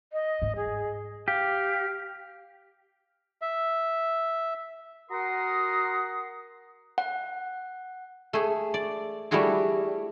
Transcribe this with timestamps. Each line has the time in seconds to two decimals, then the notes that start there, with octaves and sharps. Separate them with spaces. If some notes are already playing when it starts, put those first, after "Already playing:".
0.13 D#5
0.42 G#2
0.56 G#4
1.28 G4 F5
3.42 E5
5.11 F#4 A#4 F#5 A#5 C6 D#6
6.98 F#5
8.33 A3 G#4
8.74 D5
9.31 G3 A3 E4 F#4 G#4